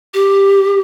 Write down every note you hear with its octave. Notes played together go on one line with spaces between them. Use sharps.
G4